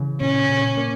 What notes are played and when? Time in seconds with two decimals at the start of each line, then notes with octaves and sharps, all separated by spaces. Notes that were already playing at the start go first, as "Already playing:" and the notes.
Already playing: C#3 E3
0.21 A#2 C#4
0.49 A#2
0.77 A#3